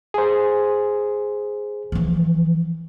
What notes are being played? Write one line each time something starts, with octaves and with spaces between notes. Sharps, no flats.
G#4 C5
E3 F3